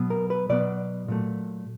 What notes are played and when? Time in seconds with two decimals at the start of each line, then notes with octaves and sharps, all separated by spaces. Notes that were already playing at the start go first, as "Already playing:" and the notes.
Already playing: B2 F#3 B3
0.10 A#4
0.30 B4
0.49 B2 F#3 B3 D5
1.08 A#2 F#3 A3